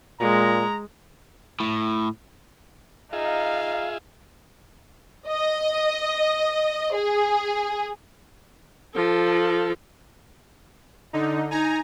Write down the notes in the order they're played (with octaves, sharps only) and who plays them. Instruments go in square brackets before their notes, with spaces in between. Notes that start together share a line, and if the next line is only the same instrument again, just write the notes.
[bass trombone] A#2 [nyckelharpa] G#3 [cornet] A#5
[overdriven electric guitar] A2
[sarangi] D#4 [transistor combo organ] F4 G#4 E5 [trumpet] F5
[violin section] D#5
G#4
[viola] F3 A4
[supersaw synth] D3 D#4
[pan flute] D#4 [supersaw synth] G#5 A#5